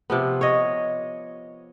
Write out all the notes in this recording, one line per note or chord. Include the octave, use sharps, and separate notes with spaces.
C3 F3 B3
C#5 D#5